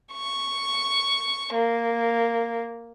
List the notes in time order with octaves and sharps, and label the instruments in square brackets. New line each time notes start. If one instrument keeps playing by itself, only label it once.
[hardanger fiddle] C#6
A#3